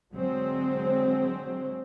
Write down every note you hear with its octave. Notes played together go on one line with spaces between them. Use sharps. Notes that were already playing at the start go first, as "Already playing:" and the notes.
D3 F#3 G#3 C4